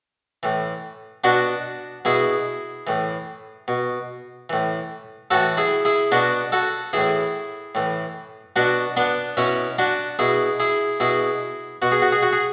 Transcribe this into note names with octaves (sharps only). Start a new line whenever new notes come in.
A2 E3
B2 D4 F#4
B2 E4 G#4
A2 E3
B2
A2 E3
A2 E3 F#4 A4
E4 G#4
E4 G#4
B2 D4 F#4
F#4 A4
A2 E3 E4 G#4
A2 E3
B2 D4 F#4
B3 D4
B2 C#4 E4
D4 F#4
B2 E4 G#4
E4 G#4
B2 E4 G#4
B2 F#4
G#4
F#4
G#4
F#4
G#4